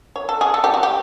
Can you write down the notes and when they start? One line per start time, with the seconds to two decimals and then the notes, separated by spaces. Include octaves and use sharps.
0.16 C#5
0.29 A4
0.41 G#4
0.54 A4
0.64 G4
0.74 F#4
0.83 G4